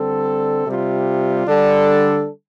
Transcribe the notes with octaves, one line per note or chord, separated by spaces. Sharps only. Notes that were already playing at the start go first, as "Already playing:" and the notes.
Already playing: D3 G3 C4 A4
C3 G3 F4
D3 G3 D4 A4